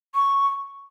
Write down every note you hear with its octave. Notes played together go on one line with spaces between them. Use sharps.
C#6